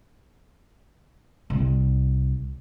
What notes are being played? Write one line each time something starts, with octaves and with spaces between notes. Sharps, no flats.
C2